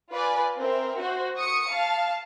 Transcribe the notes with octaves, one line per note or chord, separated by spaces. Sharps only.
F4 B4 D5 G#5
C4 A#4 E5
F#4 C5
C#6 D#6 C#7
F5 A5